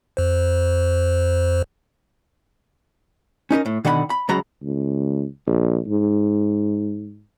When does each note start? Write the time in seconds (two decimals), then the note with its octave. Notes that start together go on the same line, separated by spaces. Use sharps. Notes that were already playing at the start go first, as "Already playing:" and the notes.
0.17 F2 C5
3.51 C#4 D#4 G4 A#4
3.66 A2
3.85 B2 D3 D#3 F#5 B5
4.10 B5
4.29 C#2 C#3 F#3 F#4 A#5 B5
4.63 C#2
5.47 A#1
5.87 G#2